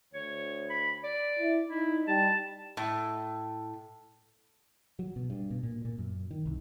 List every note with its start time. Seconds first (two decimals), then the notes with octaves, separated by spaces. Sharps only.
0.14 D2 C#5
0.70 B5
1.04 D5
1.39 E4
1.69 D#4 E4
2.08 G3 A5
2.77 A2
4.99 F#3
5.16 B2
5.30 G2
5.50 B2
5.63 A#2
5.85 A#2
5.98 F#2
6.31 D#3
6.46 C2